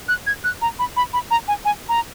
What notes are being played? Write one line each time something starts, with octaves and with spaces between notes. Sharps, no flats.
F#6
G#6
F#6
A#5
B5
B5
B5
A#5
G#5
G#5
A#5